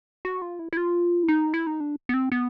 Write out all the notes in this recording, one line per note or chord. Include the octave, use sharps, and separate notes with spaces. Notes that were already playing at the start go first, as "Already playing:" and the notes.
F#4
F4
E4
E4
F4
E4
D#4
E4
D#4
D4
B3
C4
B3